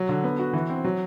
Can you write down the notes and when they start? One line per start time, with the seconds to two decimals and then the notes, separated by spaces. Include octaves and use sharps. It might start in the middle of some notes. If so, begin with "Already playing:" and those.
Already playing: F#3
0.09 D3
0.24 B3
0.39 F#4
0.53 E3
0.70 C4
0.84 F#3